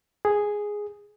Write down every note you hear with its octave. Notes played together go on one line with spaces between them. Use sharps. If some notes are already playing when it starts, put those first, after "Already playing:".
G#4